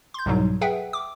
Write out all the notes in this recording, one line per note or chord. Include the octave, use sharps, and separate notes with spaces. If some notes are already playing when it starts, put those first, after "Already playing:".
C6 G6
C2 G#2 B2 F#3
G#4 B4 E5 F#5 G5
D6